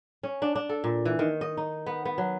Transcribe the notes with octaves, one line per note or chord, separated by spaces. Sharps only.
C#4
D4
D4
A4
A#2
E3
D#3
D#5
D#4
B3
B3
F#3